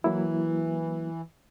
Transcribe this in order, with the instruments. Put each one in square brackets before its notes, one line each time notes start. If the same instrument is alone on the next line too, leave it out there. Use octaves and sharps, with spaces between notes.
[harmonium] E3 [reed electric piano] F#3 A#3 E4